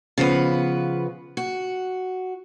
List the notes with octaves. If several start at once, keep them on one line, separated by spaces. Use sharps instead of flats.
C#3 F3 B3 B4
F#4